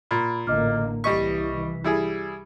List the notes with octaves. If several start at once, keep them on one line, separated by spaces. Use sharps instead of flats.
A#2 B5
A1 D3 A#3 D#5 D6 F6
C2 E3 G3 D#5 C#6 B6
G3 E4 G#4